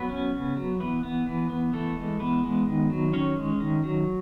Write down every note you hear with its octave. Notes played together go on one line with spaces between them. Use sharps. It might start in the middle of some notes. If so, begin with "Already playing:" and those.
Already playing: F#3 B3 B4
C#4
C#3
F#3
E3 B3 B4
B3
E3
B3
E3 A3 A4
G#3
E3 B3 B4
G#3
D#3
F#3
D#3 C#4 C#5
G#3
D#3
F#3